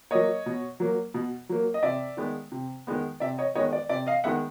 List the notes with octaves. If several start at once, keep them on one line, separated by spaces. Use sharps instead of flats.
F#3 A#3 C#5 D#5
B2
F#3 A#3
B2
F#3 A#3
D#5
C3 D5 E5
D#3 G#3 B3
C3
D#3 G#3 B3
C3 D5 E5
C#5 D#5
D#3 G#3 B3 C#5 D#5
D5
C3 D5 E5
D#5 F5
D#3 G#3 B3 E5 F#5